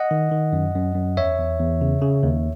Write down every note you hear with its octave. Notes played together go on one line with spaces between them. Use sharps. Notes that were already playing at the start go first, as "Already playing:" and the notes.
Already playing: D#5 F#5
D#3
D#3
F#2
F#2
F#2
E2 C#5 E5
E2
E2
C#3
C#3
D#2